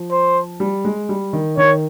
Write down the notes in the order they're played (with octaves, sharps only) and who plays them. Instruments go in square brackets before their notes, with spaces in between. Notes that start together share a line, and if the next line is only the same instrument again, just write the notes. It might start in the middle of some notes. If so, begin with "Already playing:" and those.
Already playing: [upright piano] F3
[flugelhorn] C5
[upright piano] G3
G#3
G3
D#3
[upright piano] D#3 [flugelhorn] C#5